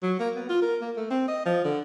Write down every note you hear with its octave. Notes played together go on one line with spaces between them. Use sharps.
F#3
A#3
B3
F4
A#4
A#3
A3
C4
D#5
F3
D3